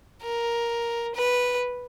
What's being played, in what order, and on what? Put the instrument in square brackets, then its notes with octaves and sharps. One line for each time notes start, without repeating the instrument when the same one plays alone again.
[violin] A#4
B4